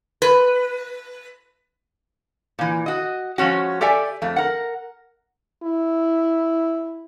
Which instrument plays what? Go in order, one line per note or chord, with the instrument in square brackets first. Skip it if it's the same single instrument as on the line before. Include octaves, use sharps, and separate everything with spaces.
[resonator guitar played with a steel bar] B4
A#2 E3
F#4 D#5
F3 G#3 C#4 F#4
G4 A4 D5 E5 G#5
F2 A3
A#4 F#5
[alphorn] E4